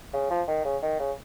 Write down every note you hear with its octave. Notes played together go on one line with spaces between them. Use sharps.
C#3
F3
D#3
C#3
D#3
C#3